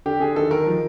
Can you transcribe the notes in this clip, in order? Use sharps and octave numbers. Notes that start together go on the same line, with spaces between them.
D3 G4
D3 G#4
D#3 A4
D#3 A#4
F3